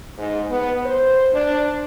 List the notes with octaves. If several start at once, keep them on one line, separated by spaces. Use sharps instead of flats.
G#2
B3
C5
D4